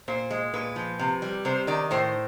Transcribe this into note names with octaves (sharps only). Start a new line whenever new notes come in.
A#2 C5
G#3
A#2 B4
F3
C3
G3
C3 C5
D#3 D5
A2 C5